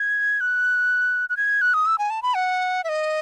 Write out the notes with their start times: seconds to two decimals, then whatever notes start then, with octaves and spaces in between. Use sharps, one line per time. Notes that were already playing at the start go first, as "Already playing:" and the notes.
Already playing: G#6
0.41 F#6
1.30 F#6
1.37 G#6
1.61 F#6
1.74 D#6
1.86 E6
1.98 G#5
2.10 A5
2.23 B5
2.34 F#5
2.84 E5
2.89 D#5